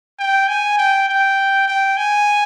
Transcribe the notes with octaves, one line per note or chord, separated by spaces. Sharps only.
G5
G#5
G5
G5
G5
G#5